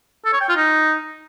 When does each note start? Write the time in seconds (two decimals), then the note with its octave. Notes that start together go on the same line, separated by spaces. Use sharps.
0.25 A4
0.33 C#5
0.41 G5
0.49 F4
0.56 D#4